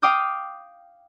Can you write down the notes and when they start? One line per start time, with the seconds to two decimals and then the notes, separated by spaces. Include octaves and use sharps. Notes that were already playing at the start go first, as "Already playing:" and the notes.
0.02 F5 G5 D6 D#6 F6 G6